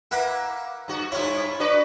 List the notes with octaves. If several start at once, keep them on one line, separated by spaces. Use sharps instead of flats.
A#3 E4 B4 F#5
G2 F#4
G2 E4 F4 C#5
D4 F#4 B4